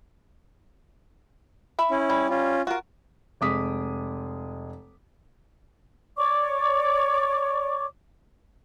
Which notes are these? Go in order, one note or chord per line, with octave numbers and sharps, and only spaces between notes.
E5 B5
C#4 E4
G3
C#4 F4
F4 F#4 A#4
F1 G#3 D6 D#6 B6
C#5 D5 C#6 D6